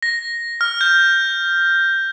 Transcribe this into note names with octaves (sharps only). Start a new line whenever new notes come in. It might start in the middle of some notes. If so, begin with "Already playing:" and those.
A#6
F6
G6